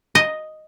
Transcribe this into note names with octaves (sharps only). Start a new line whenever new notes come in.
D#5